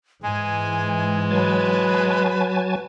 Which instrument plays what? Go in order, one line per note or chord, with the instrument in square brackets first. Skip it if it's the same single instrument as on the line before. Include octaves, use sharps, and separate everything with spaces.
[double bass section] G#2 E3 [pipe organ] G#3 [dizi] G#5
[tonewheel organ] F#3 G#5 A5 [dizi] B4